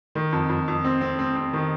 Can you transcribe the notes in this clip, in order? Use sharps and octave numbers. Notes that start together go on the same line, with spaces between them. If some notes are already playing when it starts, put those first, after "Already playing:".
D#3
F2
F2
F2
C4
C4
C4
C4
D#3